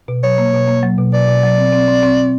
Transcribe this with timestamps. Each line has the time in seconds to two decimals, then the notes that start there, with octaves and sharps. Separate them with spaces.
0.08 B2
0.23 F#3 C#5
0.38 A#3
0.54 B2
0.68 A#3
0.83 F#3
0.98 B2
1.13 B2 D5
1.28 B2
1.43 F#3
1.58 C4
1.73 C4
1.88 C4
2.03 C4
2.17 C4